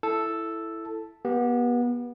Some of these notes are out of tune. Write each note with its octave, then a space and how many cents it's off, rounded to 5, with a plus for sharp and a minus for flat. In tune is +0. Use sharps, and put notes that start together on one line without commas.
E4 +5 A4 +0
B3 -30 G4 +0